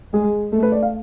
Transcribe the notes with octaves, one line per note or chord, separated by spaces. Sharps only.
G#3 G#4
A3 A4
B4
D5
F5